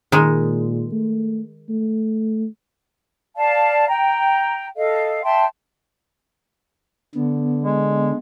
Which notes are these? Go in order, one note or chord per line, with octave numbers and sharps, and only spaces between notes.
A#2 D#3 G#3
A3
A3
D5 F5 A5
G5 A#5
A4 D#5 F5
E5 G5 A5 C6
D3 B3
G#3